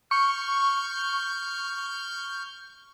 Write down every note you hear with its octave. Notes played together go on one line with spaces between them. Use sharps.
C#6 F6 G6